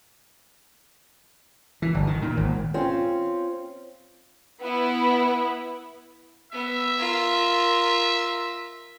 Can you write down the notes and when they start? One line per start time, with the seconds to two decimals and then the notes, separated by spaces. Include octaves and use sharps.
1.82 E3
1.94 G1
2.07 D#3
2.22 A#2
2.37 G#1
2.74 C4 C#4 F4
4.61 B3 E4
6.53 B3 E5
6.98 F4 A#4